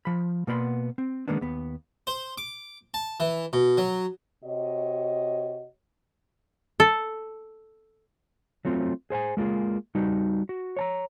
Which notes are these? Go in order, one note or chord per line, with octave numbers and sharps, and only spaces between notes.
F3 B5
B2 A#3 B3 D5 B5 C6
C4
D#3 G#3 A#3 B3 D4
D#2 B3
C5
D6
A5
E3
B2
F#3
C3 F#4 C#5 D#5
A4
F#3 A3 C4 F4
G#4 C5 G5 G#5
G#3 A#3 F4 G#4
G3 D#4 F#4
F#4
C#5 A5 A#5